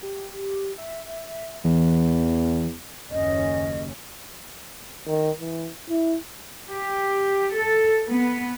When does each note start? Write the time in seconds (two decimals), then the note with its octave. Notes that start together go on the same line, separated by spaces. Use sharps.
0.03 G4
0.78 E5
1.64 E2 E3
3.11 F#1 D#2 C#4 D#5
5.07 D#3
5.41 E3
5.89 E4
6.70 G4
7.55 A4
8.07 B3